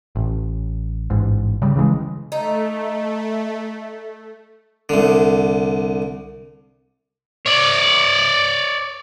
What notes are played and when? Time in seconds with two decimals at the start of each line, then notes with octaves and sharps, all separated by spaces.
0.15 A1
1.10 A1 G#2
1.62 C#3 G3
1.76 C#3 E3 F#3 G#3
2.32 A3 D#4
4.89 C2 D3
7.46 C#5 D5